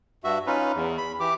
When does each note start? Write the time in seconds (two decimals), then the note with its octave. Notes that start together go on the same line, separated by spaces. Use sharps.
0.24 G2 F#4 E5
0.47 C#4 D#4 F4 B4
0.75 E2
0.98 B5
1.20 E3 G4 D6